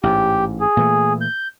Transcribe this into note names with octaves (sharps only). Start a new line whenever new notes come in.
A1 G#2 G4
G#4
A#2 E3 A3
G6